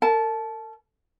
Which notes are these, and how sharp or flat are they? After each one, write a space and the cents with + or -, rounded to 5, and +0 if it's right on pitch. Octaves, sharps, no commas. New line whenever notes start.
A#4 -40 A5 -20